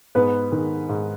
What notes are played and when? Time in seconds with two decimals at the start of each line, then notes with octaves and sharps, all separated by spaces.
0.15 G#2 B3 B4
0.52 D#3 G#3
0.89 G#2